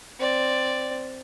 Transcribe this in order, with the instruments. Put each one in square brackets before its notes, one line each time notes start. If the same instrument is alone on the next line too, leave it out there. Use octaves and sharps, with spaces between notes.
[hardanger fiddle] C4 D5